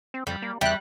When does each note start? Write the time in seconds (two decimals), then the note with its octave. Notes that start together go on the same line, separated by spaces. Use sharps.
0.14 C4
0.27 F2 G3
0.42 A#3
0.61 E2 G3 E5 G5 F#6